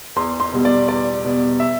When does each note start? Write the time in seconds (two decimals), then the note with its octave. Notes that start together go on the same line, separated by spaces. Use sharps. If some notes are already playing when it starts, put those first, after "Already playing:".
0.16 E2 C6
0.40 C6
0.53 B2 G3 B3
0.65 D5
0.88 E2 D5
1.24 B2 G3 B3
1.60 E5